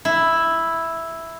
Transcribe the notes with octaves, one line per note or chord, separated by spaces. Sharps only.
E4